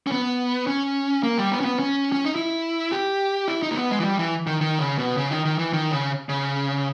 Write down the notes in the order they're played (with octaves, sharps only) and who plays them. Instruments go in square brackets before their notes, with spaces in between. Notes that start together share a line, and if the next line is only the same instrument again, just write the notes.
[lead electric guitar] C#4
B3
C#4
A#3
G3
B3
C#4
B3
C#4
C#4
D#4
E4
G4
E4
D#4
A#3
B3
G#3
E3
G3
E3
D#3
D#3
C#3
B2
C#3
D#3
D#3
E3
D#3
C#3
C#3